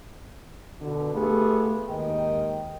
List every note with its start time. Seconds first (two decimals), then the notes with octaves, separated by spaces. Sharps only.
0.81 B2 D3
1.14 A3 B3 F4 G4 G#4
1.88 D#2 G#2 D#3 A#4 D#5 G5